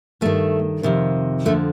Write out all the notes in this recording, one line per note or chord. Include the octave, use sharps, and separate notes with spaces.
G2 D#3 A3
F2 C3 D#3
F2 D3 F3 A3